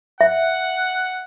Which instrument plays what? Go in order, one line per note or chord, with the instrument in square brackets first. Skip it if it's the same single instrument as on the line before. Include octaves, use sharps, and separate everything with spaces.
[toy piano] E5 [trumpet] F#5